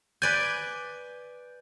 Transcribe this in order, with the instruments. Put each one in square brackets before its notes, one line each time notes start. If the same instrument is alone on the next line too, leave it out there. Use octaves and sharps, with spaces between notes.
[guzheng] B4 D5 G#5 [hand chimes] G6